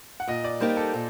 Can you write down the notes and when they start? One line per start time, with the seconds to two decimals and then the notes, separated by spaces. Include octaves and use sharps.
0.20 F#5
0.28 A#2 D#5
0.44 D5
0.60 G3 A#3 D#4 G4 C5
0.77 A4
0.94 A#2